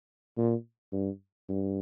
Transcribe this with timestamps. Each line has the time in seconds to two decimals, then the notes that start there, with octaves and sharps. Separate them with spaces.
0.37 A#2
0.92 G2
1.49 G2